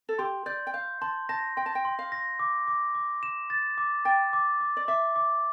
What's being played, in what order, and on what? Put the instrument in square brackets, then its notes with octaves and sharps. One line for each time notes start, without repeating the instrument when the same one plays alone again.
[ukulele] A4
[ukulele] G4 [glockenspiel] C6
[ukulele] D5 [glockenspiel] G6
[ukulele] G5
[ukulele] F5 [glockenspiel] G6
[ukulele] A5 [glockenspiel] C6
[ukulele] A5 [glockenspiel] A#6
[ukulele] G5 [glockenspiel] C6
[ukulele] A5
G5
[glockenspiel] C6
[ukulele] F5
[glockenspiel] A#6
D6
D6
D6
E7
A6
D6
[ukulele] G5 [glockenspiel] A6
[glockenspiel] D6
D6
[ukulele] D5
[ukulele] E5 [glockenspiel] D6
[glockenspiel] D6